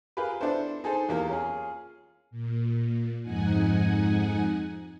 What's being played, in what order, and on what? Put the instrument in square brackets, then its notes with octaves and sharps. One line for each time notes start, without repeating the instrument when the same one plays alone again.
[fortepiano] F4 G4 G#4 A#4 B4
B3 D4 E4 A4 C5
D#4 G#4 A4 C5
E2 A#3 G4 A#4
C#4 F4 G#4
[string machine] A#2
F2 G#2 D#4 F#5 G#5